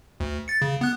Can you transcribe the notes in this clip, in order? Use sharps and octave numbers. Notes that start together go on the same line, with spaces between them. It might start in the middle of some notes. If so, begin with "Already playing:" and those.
D2
A6 C#7
C#3
B3 F#6